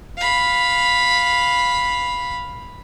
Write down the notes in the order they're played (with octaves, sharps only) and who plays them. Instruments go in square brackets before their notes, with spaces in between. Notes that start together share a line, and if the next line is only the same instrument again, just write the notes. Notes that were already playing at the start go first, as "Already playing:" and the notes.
[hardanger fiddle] F5 B5